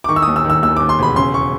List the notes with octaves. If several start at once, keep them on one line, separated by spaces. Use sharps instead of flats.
D6
D#3 C#6
E6
D#2 D#6
E6
D#3
E6
D#2 E6
D#2 D6
C6
E1 B5
C#3 C6
C#6